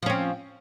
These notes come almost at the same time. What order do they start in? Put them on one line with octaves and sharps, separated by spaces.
F3 C#4 C4